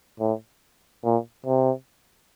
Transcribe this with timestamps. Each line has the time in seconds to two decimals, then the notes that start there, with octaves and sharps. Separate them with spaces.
0.20 A2
1.04 A#2
1.46 C3